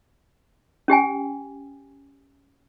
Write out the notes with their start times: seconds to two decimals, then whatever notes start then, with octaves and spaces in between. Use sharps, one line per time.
0.88 C#4 G4 G5 G#5